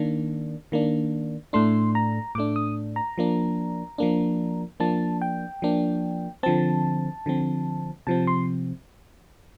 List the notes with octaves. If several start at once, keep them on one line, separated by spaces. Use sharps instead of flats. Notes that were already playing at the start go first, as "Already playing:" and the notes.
Already playing: D#3 A#3 D4
D#3 A#3 D4
A2 A3 D4 C6
A#5
A2 A3 D4 D6
D#6
A#5
F3 A#3 D4
F3 A#3 D4
F3 A#3 D4 A5
G5
F3 A#3 D4
D3 F3 C4 A5
D3 F3 C4
C3 F3 C4 A5
C6